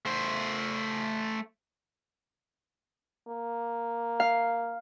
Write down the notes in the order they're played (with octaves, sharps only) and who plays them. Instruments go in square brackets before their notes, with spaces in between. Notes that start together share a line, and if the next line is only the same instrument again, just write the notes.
[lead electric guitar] A3 C5
[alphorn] A#3
[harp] F5